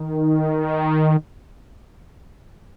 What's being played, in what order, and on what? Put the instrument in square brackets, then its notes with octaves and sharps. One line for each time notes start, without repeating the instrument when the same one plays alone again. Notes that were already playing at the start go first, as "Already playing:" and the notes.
Already playing: [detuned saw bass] D#3